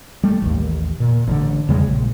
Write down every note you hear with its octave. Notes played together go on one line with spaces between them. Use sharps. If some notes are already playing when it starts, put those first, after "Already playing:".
G3 A3
A1 D#2
A#2
A1 D3
E2 C#3 G3 G#3
A#1